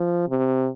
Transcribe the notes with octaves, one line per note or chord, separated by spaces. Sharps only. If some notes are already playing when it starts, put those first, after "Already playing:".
Already playing: F3
C3